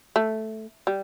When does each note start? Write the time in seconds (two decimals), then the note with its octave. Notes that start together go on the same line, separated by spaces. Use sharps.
0.16 A3
0.87 G3